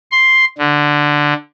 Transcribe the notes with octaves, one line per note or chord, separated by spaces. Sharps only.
C6
D3